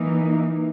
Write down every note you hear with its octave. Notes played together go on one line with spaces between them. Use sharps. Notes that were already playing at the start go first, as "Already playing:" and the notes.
Already playing: E3 A#3 D#4